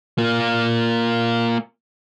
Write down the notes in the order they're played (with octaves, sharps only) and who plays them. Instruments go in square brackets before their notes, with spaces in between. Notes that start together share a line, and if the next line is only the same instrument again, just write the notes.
[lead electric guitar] A#3 F4